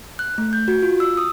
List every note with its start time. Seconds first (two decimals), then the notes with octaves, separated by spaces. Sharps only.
0.19 F#6
0.38 A3
0.53 G6
0.68 F#4
0.83 F4
1.00 E6
1.17 D#6